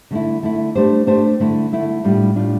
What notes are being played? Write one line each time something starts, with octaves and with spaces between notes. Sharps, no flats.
D3 A3 E4
D3 A3 E4
A3 D4 G4 C5
A3 D4 G4 C5
D3 A3 E4
D3 A3 E4
A2 G3 D4 F4
A2 G3 D4 F4